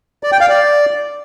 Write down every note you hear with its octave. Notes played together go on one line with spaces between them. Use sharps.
D5
G5
F5
D5